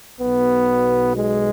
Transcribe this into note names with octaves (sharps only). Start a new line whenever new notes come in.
B1 B2 B3
G#3